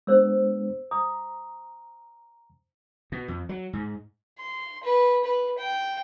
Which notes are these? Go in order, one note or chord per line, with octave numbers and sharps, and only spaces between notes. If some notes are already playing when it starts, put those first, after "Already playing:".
G#3 B3 D4 C5 E6
A#5 D#6
B2
F2
F#3
G#2
C6
B4
B4
G5